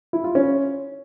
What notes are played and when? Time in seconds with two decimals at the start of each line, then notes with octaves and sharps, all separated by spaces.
0.13 E4
0.24 F4
0.35 C#4